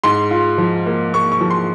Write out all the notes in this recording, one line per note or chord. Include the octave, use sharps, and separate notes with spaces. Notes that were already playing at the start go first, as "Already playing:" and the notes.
G#2 C6
F4
F3
A#3
A#3 C#6
C#6
F3
C6